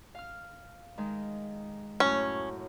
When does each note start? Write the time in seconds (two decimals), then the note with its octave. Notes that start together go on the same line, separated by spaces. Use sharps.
0.15 F5 F6
0.98 D#3 G#3
2.00 F#2 A2 C#4